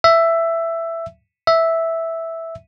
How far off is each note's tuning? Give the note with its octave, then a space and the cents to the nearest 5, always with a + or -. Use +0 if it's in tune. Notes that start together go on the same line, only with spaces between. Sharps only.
E5 +10
E5 -5